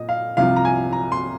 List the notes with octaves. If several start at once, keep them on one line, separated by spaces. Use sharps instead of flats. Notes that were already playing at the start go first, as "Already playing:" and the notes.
Already playing: A#2 D#5
F5
C2 C3 F3 F5
A#5
G#5
A#5
C6